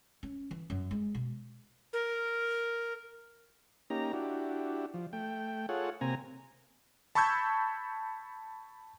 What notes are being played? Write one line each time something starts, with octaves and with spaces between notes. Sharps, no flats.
C#4
E3
F#2
G#3
B2
A#4
A#3 C#4 D#4 G4 A#5
D4 E4 F#4 G4
F3
A3 G5
F4 G#4 A4 C#5 F#5
C3 A#3 C4 G#5 A#5
A5 B5 C#6 E6 G6 G#6